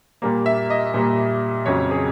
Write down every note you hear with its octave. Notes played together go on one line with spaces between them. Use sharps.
A#2 G3 A#3
E5
D#5
A#2 G3 A#3
F2 C#3 F#3 C#5
G#4